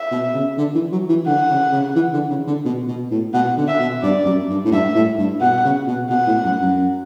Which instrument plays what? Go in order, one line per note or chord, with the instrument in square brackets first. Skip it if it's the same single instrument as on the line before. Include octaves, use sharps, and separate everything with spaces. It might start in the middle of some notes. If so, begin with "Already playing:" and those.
Already playing: [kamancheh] E5
[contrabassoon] B2
C#3
D3
E3
F#3
E3
[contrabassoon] D3 [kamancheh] F#5
[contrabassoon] C#3
C#3
E3
D3
C#3
D3
B2
B2
A2
[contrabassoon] B2 [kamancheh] F#5
[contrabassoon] D3
[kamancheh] E5
[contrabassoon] B2
[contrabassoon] G2 [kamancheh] D5
[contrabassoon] F#2
G2
A2
[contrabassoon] G2 [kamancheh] E5
[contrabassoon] A2
G2
[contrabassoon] B2 [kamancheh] F#5
[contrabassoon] C#3
B2
[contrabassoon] B2 [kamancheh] F#5
[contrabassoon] A2
F#2
F#2